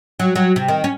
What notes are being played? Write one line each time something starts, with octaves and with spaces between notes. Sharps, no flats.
F#3
F#3
C3
D#3
C#4